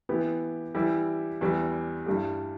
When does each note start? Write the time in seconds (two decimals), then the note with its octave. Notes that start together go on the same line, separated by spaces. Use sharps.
0.09 E3 B3 E4 G4
0.75 E3 G3 E4 G4
1.41 E2 E3 G3
2.06 G2 G3 E4 G4